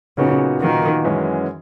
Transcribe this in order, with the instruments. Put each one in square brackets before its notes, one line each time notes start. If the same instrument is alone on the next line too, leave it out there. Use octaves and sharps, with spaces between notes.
[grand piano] A#2 F#3 B3 D#4 F#4 [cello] C#3
[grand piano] A#2 F#3 B3 D#4 F#4 [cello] D#3
[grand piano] F#2 E3 G#3 C#4 F#4